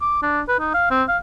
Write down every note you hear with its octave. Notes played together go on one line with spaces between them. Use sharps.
D6
D4
B4
D#4
F5
C4
F5